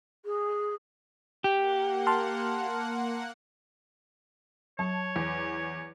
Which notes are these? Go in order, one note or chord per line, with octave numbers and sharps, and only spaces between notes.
G#4
A#3 G4 F#5
A5 C6 F6
F#3 C#5 A5
E2